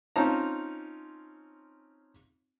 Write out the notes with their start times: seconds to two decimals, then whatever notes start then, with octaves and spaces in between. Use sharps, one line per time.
0.16 C4 C#4 D#4 F4 A5 A#5